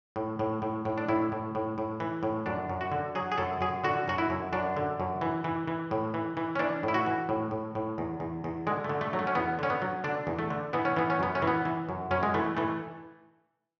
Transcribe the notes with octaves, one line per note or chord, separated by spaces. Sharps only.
A2
A2
A2
A2
D4
A2 E4
A2
A2
A2
E3
A2
F#2 D4
F#2
F#4
D3
F#3 G#4
G#4
F#2 A4
F#2 G#4
D3 F#4
F#2 F#4
E4
F#2
F#2 D4
D3
F#2
E3
E3
E3
A2
E3
E3
C#4
E3 D4
A2
E4
F#4
E3
A2
A2
A2
E2
E2
E2
D3 G#3
A3
D3
A3
F#3
A3
C#4
E2 B3
D3 C#4
B3
F#3
D3 D4
E2
A3
D3
E3 B3
C#4
E3 B3
C#4
F#2 B3
C#4
E3
B3
E3
F#2
F#2 C#4
G#3
E3 A3
E3 A3